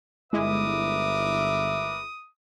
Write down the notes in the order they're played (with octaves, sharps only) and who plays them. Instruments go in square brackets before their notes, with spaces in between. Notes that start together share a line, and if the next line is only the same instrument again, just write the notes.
[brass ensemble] G1 E5 [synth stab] G#3 E4 [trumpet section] A#4 B4 D6 [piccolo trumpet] D#6